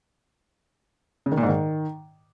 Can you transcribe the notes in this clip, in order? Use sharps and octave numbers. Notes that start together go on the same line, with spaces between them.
C#3
D#3
A#2
G#2
D#3